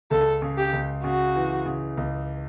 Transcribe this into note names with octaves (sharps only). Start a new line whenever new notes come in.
C#2 A4
C#3
G4
C#2
C#3 F#4
E3
C#3
C#2